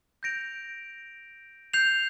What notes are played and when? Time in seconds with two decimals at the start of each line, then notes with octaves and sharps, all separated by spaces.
0.23 G6 A#6 D7 F7
1.73 G6 C7 F7